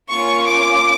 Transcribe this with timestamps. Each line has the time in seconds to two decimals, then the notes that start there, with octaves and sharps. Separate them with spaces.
0.09 A#3 C#4 F4 C#6
0.46 D6